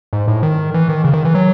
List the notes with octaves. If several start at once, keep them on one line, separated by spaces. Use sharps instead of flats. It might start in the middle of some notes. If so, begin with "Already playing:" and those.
G#2
A2
D#3
E3
D#3
C#3
D#3
E3
F#3